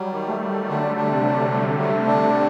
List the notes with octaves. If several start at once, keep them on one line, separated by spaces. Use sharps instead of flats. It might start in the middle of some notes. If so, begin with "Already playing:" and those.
Already playing: F#3 G3
D#3
A3
F#3
D3 D4
D4
C3
F#3
A3
A3
D4